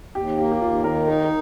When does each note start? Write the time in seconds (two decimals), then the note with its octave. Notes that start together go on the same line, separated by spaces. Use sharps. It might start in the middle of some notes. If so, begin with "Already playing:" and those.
0.15 D#2 G4
0.38 A#3 G4
0.52 G4
0.62 D#2 F4
0.84 D#3 A#4
1.08 D#4 A#4
1.24 A#4